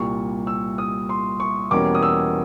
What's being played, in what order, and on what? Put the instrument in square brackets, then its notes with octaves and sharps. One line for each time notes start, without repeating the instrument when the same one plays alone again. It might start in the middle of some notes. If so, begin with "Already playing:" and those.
Already playing: [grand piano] C2 A#2 G3 C#6
E6
D#6
C6
C#6
E2 B2 G3 A#3 C#4 D6
D#6
E6